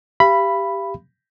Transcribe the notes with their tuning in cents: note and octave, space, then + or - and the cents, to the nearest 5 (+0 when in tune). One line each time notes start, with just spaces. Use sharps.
G4 +5 F5 -45 B5 +0